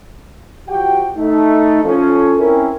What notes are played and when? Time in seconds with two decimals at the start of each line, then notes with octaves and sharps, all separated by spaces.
0.68 F3 F#4 G4 F#5 G5
1.17 A3 D#4
1.84 F3 C#4 A4
2.39 C4 C#4 E4 A#4